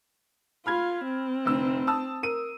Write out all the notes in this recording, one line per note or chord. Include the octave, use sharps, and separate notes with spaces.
F4 B5 F6 G#6
C4
F1 D2 E6
A5 D#6 E6
A#4 D#7